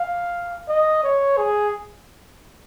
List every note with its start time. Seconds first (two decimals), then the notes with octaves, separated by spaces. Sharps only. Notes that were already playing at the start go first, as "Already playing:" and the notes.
Already playing: F5
0.68 D#5
1.04 C#5
1.38 G#4